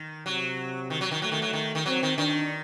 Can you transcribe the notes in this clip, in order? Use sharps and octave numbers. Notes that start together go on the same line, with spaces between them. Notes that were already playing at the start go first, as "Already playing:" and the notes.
Already playing: D#3
C3 F#3
D#3
F#3
D#3
F#3 A3
D#3
F#3
D#3
D#3
F#3 C4
D#3
D#3 D4